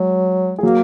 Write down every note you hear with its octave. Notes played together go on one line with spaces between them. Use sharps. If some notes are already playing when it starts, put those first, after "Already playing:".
Already playing: F#3 G#3
G#4
F#3 A#3 F#4